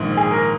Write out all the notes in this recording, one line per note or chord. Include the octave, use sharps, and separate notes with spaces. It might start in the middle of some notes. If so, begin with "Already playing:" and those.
Already playing: A#1 G#2 D#3
G#4
A#4